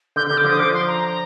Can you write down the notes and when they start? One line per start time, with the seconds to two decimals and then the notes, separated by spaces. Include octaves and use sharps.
0.16 D3 G6
0.27 G6
0.31 D3
0.37 D6
0.44 D3 F3 D#6
0.59 D3 F3 D6
0.73 C6
0.87 A#5